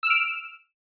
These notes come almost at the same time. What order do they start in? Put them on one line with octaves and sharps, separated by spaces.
E6 F6 D7 E7